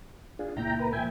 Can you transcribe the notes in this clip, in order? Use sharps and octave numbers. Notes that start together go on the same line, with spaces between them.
D4 F4 G#4
C#2 A#2 E4 G5 A#5
A#4 B4
A#2 F3 E5 G5 G#5